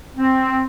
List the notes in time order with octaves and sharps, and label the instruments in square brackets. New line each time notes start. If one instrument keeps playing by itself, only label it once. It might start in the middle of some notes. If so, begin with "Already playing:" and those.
[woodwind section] C4